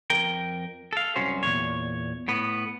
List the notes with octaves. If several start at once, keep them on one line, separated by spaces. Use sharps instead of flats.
F2 A#4 G5
A4 F5
C2 F#2 F#3 C#4 C5
E2 A#2 C#5
A2 B3